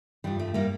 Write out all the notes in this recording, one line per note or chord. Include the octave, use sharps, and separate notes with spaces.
G2 F3 G3
A3
G3 A#3